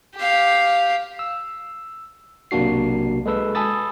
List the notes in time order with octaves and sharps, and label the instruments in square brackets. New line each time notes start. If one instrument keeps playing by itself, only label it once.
[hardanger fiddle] G4 F5
[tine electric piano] E6
B1 C3 A#3 D4 F#4 C7
G#3 A4 B4 E6
G#5 A5 B5 D#6 E6 A6